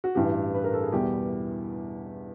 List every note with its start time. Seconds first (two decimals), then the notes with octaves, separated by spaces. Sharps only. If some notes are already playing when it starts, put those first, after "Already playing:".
0.04 F#4
0.15 A1 G2 E3 G4
0.54 B4
0.64 A#4
0.73 A4
0.83 G#4
0.92 E2 B2 G3 B3 E4 G4